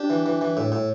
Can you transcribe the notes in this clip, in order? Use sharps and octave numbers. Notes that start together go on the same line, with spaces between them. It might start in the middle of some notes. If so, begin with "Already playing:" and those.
Already playing: D4 G4
E3
E3
E3
A2
A2